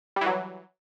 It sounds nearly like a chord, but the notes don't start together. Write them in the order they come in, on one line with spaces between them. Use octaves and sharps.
G3 E3 F#3